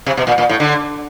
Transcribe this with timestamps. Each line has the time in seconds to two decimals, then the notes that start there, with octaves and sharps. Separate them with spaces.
0.06 C3
0.17 B2
0.27 A#2
0.38 A#2
0.49 A2
0.60 D3